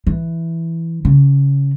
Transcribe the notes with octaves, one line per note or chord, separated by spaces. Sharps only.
E3
C#3